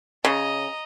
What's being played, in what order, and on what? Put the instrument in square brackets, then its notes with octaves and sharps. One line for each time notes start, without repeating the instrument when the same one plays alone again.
[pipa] C#3 [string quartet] D#5 A#5